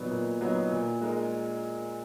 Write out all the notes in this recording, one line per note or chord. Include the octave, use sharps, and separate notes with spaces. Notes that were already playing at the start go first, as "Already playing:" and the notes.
Already playing: A#2 F#3 B3 D#4
A#2
F#3 B3 D#4
A#2
G#3 D#4 A#4